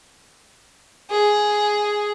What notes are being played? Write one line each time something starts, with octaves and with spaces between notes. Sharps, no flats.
G#4